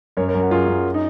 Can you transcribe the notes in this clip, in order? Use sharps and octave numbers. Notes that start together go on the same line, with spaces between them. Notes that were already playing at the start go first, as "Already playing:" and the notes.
F#2 A#4 C#5
A#4 C#5
F#2
F#4 A#4
F#2 F4 G#4
F#2
D#4